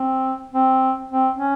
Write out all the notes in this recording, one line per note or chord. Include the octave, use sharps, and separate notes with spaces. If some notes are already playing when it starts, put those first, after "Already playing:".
Already playing: C4
C4
C4
C#4